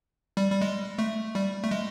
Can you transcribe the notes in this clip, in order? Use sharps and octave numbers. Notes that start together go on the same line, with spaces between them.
G3
G3
G#3
A3
G3
A3
G#3